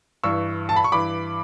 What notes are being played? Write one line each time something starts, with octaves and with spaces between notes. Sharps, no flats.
G2 E3 C#6 E6
A5
B5
C#6
G2 E3 B5 D6